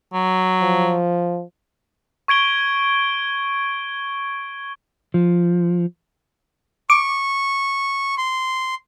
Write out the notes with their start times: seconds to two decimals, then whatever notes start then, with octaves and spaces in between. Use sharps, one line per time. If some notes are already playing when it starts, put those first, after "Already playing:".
0.13 F#3
0.62 F3
2.28 C#6 G#6 D7 G7
5.14 F3
6.90 C#6 D6
8.18 C6